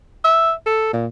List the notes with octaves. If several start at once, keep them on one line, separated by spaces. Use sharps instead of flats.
E5
A4
A#2